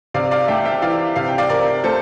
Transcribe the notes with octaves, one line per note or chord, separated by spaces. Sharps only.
C3 D5 F5
D5 F5
A3 E5 G5
E5 G5
E3 D5 F5
C3 F5
G5
D5 F5
C3 A#4 D5
A3 A4 C5